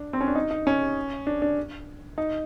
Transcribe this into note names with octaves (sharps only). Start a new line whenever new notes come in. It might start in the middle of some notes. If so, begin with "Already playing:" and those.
Already playing: D4
C4
C#4
D4
D#4
D#4
C#4
D4
D4
D#4